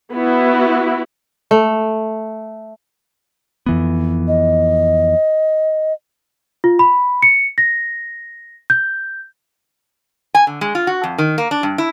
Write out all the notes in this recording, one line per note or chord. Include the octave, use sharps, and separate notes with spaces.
B3 E4 F#4
A3
F2 E3 B3
D#5
F4
B5
C#7
A#6
G6
G#5
D3
G#3
F4
F#4
F2
D#3
A#3
D4
G2
E4